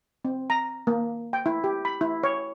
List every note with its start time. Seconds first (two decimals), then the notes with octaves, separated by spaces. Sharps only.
0.25 C4
0.50 A#5
0.87 A#3
1.33 G5
1.46 E4
1.64 G4
1.85 B5
2.01 E4
2.23 C#5